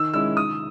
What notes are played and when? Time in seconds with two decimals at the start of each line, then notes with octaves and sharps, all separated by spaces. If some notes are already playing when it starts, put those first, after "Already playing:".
Already playing: D#3 E6
0.14 G#3 C#4 E4 E6
0.37 D#3 D#6